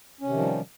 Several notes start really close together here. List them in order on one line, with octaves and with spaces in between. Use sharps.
C#4 C3 D#3 F3 G3